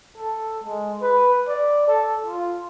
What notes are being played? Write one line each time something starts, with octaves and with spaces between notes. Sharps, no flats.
A4
G#3
B4
D5
A4
F4